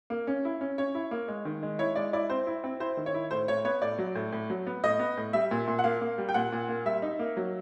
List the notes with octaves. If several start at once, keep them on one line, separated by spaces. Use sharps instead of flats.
A#3
C#4
E4
C#4
C#4 C#5
E4
A#3
G#3
D#3
G#3
E4 C#5
G#3 D5
E4 D5
C4 C5
E4
C4
E4 C5
D#3
C#5
E4
A2 C5
A2 C#5
B3 C#5
A2 D5
F#3
A2
A2
F#3
B3
A2 D#5
B3
A2
G3 E5
A#2
A#2
F#5
A#3 F5
A#3
G3
G5
A#2 F#5
A#2
A#3
G3 E5
D#4
A#3
F#3